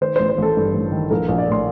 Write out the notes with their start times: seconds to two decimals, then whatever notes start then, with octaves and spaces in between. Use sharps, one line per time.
0.01 D#3 C5
0.16 A1 C5
0.29 C5
0.38 A1 A4
0.57 G2
0.75 A1
0.92 D#3
1.11 A#1 A#4
1.28 A#1
1.38 D5
1.47 A2 C6